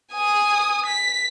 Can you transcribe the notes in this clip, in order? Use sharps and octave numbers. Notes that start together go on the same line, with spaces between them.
G#5 D#6
B6